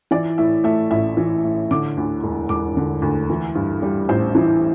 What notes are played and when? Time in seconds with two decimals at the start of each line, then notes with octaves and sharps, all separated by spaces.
0.11 E3 D5
0.38 A2 E5
0.64 A3 E5
0.91 A1 E5
1.17 E3
1.44 A2
1.71 D3 D6
1.97 D2
2.24 E1
2.49 E1 D6
2.77 D3
3.02 D2
3.30 E3
3.55 G2
3.82 G3
4.09 A1 C5
4.35 E3